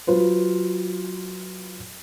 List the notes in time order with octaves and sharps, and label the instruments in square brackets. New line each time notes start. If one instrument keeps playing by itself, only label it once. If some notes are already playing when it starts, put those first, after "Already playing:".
[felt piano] F#3 F4 B4 C5